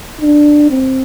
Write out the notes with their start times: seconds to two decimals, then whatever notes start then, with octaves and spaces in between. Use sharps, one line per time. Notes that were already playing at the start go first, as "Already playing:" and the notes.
0.21 D4
0.70 C4